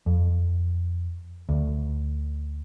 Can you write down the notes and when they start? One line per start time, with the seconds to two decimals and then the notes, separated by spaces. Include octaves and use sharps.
0.06 F2
1.49 D2